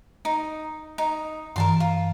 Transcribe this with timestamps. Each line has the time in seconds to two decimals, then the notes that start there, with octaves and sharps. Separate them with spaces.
0.25 D#4
0.98 D#4
1.56 G2 E3 A#4 A5 C6
1.80 F4